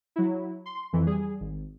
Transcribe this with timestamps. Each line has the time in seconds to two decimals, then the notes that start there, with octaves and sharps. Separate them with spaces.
0.16 F#3 E4
0.66 C6
0.93 F2 E3
1.07 G3 G#4
1.40 G#1